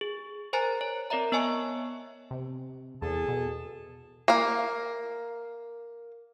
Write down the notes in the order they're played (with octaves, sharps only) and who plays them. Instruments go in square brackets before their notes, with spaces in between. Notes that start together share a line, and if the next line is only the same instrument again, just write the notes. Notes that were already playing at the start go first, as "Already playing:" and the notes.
[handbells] G#4
A#4 C5 G#5 A#5 F#6 A6
C#5
C4 A#4 D5 E5 A#5
B3 C#5 D#5 G#5 A5 C#6
[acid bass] C3
[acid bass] E2 [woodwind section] G#4 A4 A5
[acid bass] B2
[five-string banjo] A#3 F5